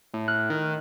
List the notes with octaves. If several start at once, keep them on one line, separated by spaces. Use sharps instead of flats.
A2
F6 F#6
D#3